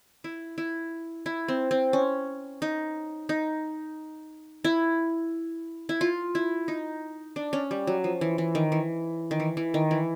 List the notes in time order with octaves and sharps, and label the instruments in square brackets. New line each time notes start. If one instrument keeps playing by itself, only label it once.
[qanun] E4
E4
E4
C4
C4
C#4
D#4
D#4
E4
E4
F4
E4
D#4
D4
C#4
G3
F#3
F3
E3
E3
D#3
E3
D#3
E3
E3
D#3
E3